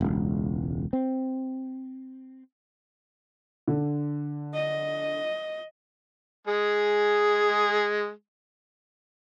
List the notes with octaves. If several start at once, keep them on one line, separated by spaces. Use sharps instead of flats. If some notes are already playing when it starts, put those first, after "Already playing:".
E1 C#2
C4
D3
D#5
G#3 G#4